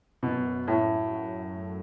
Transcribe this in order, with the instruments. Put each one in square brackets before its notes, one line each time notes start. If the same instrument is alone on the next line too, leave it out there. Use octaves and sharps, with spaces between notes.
[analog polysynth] F#2 [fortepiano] B2
[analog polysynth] F#2 [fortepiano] A2
[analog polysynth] F#3
A3